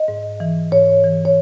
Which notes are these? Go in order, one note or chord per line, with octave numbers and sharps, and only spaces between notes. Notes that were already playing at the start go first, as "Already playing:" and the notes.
Already playing: D#5
G#2
E3
G#2 C#5
E3
C#5